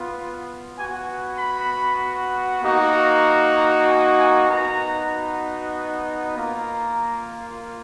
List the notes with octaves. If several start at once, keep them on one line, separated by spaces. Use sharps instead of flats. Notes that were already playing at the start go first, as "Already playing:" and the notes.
Already playing: B3 F4
B3 F#4 G#5
B5
A#3 D#4 F#4
A#5
G#5
G#5
B3 D#4 F#4 A#5
A#3 F4 A#5